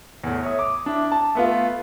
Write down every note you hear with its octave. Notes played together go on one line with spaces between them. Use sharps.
E2 A2
C#5 E5 D#6
D6
D4 E4
A5
A3 B3 F4